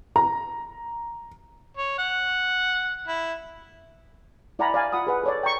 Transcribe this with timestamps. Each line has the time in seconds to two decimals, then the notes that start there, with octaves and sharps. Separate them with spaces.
0.16 A#5
1.77 C#5
1.98 F#5
3.08 E4
4.59 E4 D5 F#5 G#5 A#5 B5
4.74 D5 F5 G#5
4.93 F4 F#5 B5 D#6
5.07 G#4 B4 F#5
5.23 A4 C#5 D5
5.43 G5 A#5 C#6